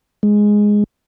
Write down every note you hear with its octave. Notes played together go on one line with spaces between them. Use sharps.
G#3